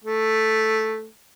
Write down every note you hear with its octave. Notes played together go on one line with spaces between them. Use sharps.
A3